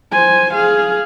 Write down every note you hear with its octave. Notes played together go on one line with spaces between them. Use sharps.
C5 G#5
G#4 F5